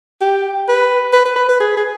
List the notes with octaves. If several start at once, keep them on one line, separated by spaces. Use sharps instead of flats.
G4
B4
B4
B4
B4
B4
G#4
G#4